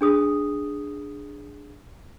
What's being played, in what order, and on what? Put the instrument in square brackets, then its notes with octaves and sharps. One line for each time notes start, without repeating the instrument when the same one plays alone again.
[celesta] D4 G#4 D#6